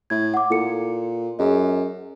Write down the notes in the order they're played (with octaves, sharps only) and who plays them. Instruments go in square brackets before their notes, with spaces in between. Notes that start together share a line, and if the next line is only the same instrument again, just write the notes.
[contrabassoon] A2 [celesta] G#6
[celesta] F#5 D6
[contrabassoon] A#2 [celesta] E4 A4 C#7
[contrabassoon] F#2 [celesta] G#4 D#5